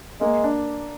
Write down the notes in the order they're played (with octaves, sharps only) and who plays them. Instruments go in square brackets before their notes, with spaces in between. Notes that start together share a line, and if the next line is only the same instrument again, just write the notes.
[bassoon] G#3 [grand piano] A#3
[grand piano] D4